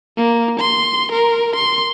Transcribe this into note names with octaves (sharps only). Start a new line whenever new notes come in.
A#3
C6
A#4
C6